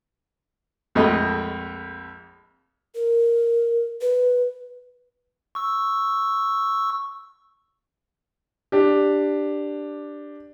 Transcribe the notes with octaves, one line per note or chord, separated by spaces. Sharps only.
A#1 F2 G#3 A3 D#5
A#4
B4
C#6 E6
D4 G4